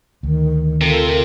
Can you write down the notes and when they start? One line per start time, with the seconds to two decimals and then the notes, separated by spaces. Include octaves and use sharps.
0.23 D2 D#3
0.81 C3 F4 A4 A#4